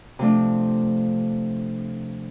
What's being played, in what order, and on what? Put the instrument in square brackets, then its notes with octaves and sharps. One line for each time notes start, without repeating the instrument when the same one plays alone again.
[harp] C3 F3 A3 D4